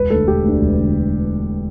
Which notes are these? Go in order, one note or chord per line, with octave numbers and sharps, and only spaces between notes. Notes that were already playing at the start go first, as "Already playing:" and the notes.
Already playing: E1 B4
D2 D3 A4
E1 G4
D2 D3
E1
D2 D3